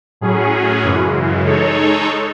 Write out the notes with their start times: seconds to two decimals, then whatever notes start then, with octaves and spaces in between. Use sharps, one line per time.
0.21 A2 F#3 C#4 G#4
0.83 F#2 C#3 E3 G#3
1.45 G#3 D#4 A4 C#5